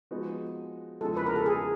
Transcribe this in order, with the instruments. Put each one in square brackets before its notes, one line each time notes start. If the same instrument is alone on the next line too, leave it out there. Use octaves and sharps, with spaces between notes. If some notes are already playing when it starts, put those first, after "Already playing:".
[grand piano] F3 G#3 B3 D#4 F#4
[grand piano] E2 C#3 F3 G#3 [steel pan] A4
[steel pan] B4
A#4
A4
G#4